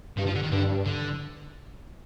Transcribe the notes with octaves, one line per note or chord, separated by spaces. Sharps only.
G2 D#3
F3
D3
D#3
G2 D3
D3